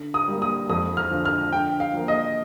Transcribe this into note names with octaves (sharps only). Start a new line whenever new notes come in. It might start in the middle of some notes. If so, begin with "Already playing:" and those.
Already playing: D3
D#6
G3 A#3
D#6
F2 D#6
F6
D3 F3
F6
D3 G5
F5
F3 A#3
D#5